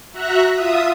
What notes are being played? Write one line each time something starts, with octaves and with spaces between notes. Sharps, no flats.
F#4 E5 A#5 F#6
F4 E5 D#6